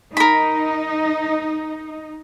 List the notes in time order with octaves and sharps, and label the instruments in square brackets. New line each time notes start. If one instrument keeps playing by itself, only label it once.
[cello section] D#4 [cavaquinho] A#4 B5